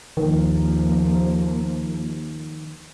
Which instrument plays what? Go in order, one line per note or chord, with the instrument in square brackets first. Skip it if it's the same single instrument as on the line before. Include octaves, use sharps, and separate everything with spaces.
[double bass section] D#2 F3 A#3 [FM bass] D#3